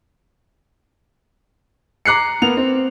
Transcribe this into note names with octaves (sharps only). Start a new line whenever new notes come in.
A#5 D6 F#6 C7 C#7
A#3 B3 F7
C4